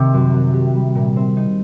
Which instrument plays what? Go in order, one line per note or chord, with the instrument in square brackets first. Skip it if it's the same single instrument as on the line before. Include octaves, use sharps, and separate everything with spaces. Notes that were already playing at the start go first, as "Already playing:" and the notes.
Already playing: [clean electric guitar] C3 [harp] D#3 A#3
[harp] F#2
F#3
G4
G3
A#2
C4
D#4